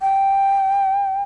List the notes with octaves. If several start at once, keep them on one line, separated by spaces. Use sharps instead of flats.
G5